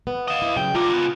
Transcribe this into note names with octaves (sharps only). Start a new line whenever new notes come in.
B3
D#5 F5
E4
C#3 F#3 G5
D3 G3 F4 A#5
C#3 B3